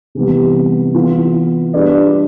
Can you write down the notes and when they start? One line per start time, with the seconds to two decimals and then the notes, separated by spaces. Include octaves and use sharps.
0.15 C3 E3 G3 B3
0.95 E3 B3 F4
1.74 G3 D4 F4 B4 D5